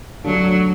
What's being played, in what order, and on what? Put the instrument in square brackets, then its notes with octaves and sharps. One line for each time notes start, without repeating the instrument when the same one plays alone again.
[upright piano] D3 A3 D4 A4 [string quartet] F#3